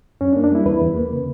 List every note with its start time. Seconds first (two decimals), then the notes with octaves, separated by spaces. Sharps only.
0.21 F#2 C#4
0.33 D4
0.36 A#3
0.44 D4
0.52 G3 E4
0.66 E2 B4
0.82 E2
0.96 A#3
1.11 C#3